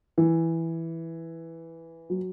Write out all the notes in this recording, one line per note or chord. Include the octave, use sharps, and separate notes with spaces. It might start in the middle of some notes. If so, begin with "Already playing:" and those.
E3
F#3